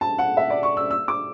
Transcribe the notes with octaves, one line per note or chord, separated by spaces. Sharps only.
A5
F#5
E5
D5
C#6
E6
E6
D6